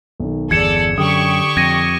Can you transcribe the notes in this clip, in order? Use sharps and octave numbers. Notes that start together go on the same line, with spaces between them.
B1 D#3
G1 E2 G#4 A4 D5 G#6 C#7 E7
F#2 D3 G4 C#6 D#6
F2 G#6 A#6 D#7